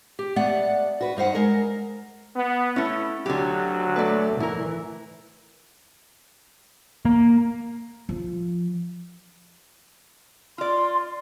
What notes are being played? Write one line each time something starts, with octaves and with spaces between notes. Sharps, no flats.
G4
A3 B3 D5 F#5
F#4 B4
G2 D#4 C5 F#5
G#3 A#4
B3
A3 C#4 E4
D2 D3 F#3 G4
A3 B4 D5
E3 E4 A#4
A#3
F3
F4 D5 C6